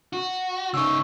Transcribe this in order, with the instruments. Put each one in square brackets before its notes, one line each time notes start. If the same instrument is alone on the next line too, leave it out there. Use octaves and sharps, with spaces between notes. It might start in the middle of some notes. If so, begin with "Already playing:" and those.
[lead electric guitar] F#4
[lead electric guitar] C#3 D#4 [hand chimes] C#6 E6